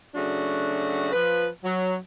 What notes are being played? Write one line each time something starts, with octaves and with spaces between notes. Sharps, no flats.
C#3 F#3 A3 D4 F#4
F3 B4
F#3